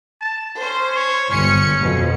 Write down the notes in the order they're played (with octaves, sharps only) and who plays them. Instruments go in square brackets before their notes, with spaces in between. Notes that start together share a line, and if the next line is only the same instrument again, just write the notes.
[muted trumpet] A5
[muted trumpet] C#4 [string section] C5
[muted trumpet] C#5
[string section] G1 C#7 [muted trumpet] C#4
[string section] F2 B2